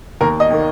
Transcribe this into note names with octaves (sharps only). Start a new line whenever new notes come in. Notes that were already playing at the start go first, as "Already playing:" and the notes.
D#2 A#4
D#5
D#3 A#3